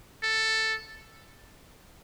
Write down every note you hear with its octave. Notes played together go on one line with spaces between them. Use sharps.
A4